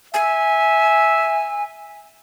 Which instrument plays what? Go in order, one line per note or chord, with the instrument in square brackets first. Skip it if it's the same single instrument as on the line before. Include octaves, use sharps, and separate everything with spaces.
[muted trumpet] E5 [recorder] G#5